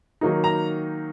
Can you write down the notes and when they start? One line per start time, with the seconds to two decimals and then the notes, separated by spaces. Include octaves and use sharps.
0.21 D#3 F#3 A#3 D#4
0.44 A#5